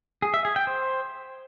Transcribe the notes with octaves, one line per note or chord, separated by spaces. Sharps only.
G#4
E5
G#4
G5
C5